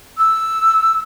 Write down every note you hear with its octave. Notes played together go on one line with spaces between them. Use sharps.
E6